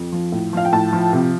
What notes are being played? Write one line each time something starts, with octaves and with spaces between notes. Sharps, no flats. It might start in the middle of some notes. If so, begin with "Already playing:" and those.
Already playing: F2
F3
A2
F3 F5
G5
A2 A5
F3
C3